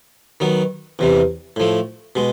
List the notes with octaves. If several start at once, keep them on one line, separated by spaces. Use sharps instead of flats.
D#3 F#3 B3
E2 C3 E3
A2 F3 A3
B2 G#3